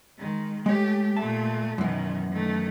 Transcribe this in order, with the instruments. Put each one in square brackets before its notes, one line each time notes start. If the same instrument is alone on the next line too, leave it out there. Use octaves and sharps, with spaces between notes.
[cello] D#3 G#3
[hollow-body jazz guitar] G#3 C#5 [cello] A3 G4
[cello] A#2 A3 [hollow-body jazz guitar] E5 A5
[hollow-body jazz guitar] F#2 E3 [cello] B2 D#3
[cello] D#3 A3